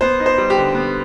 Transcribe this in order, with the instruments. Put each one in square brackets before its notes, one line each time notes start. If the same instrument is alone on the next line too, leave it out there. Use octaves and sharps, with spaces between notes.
[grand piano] B3 C5
D#4
C5
G3
G4
D3
B3